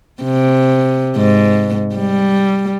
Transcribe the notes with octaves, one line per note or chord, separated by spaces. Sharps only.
C3
G#2
G3